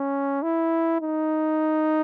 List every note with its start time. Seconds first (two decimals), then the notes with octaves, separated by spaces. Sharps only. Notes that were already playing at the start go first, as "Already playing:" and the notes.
Already playing: C#4
0.43 E4
1.02 D#4